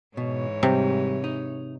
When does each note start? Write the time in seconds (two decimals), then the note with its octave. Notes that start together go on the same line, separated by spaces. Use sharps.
0.17 G#2 B2 E3 C#5
0.63 C3 G3
1.24 D#4